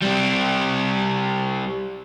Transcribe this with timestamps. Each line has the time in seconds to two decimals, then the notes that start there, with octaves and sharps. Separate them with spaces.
0.02 G3 C4